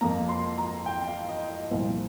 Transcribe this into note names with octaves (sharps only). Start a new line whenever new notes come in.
F2 F3 A#3 A#5
C6
A#5
G5
F5
D#5
D#5
C2 A#2 F3 C5